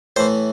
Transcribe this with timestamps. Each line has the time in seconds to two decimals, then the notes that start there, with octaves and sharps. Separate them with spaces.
0.16 A2 E3 C5